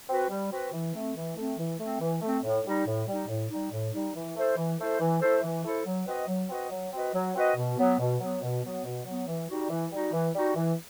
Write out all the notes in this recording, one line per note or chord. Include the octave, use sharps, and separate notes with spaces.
C4 F#4 B4
G3
C4 F#4 B4
E3
A3 C4
E3
A3 C4
E3
A3 C4
E3
A3 C4
A2
G3 D#4
A2
G3 D#4
A2
G3 D#4
A2
G3 D#4
E3
A3 E4 A4 C5
E3
A3 E4 A4 C5
E3
A3 E4 A4 C5
E3
A3 E4 A4 C5
F#3
C4 F#4 B4 D#5
F#3
C4 F#4 B4 D#5
F#3
C4 F#4 B4 D#5
F#3
C4 F#4 B4 D#5
B2
F#3 B3
B2
F#3 B3
B2
F#3 B3
B2
F#3 B3
E3
G3 D#4 F#4
E3
G3 D#4 F#4
E3
G3 D#4 F#4
E3